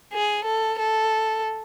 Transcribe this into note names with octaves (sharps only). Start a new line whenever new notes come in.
G#4
A4
A4